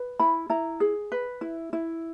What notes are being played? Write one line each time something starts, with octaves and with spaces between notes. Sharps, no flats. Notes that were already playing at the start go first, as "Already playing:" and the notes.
Already playing: B4
E4 B5
E4 A#5
G#4
B4
E4
E4